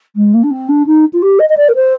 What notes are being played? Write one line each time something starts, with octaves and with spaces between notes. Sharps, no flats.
G#3
A#3
D4
C4
D4
D#4
F4
G4
D#5
D#5
D5
A#4
C5